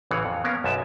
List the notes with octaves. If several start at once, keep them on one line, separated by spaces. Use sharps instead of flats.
A1 C#3 E3 F5 F#5
F2
A#3 B3 C#4 A#4 F5
B1 F#2 E5 A5